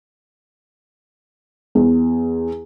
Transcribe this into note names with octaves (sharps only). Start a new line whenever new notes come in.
E2